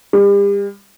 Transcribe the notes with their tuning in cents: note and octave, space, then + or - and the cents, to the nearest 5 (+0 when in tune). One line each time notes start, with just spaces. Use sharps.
G3 +40